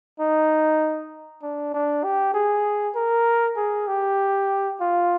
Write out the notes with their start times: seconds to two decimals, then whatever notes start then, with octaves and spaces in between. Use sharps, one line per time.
0.20 D#4
1.43 D4
1.74 D4
2.04 G4
2.34 G#4
2.95 A#4
3.57 G#4
3.87 G4
4.81 F4